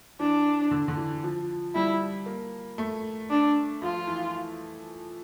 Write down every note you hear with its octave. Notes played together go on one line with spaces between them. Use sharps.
E3 D4
D3
D3
E3
F3
G3 E4
A#3
A3
D4
F3 F4
E3